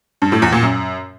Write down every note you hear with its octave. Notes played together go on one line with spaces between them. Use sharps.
G2
A2
E2
A#2
F#2